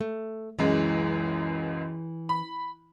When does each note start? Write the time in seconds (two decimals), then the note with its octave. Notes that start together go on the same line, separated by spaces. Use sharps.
0.01 A3
0.59 C#2 F#2 E3 G#3
2.29 B5